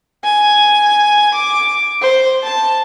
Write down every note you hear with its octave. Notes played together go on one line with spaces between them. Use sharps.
G#5
D6
C5
A5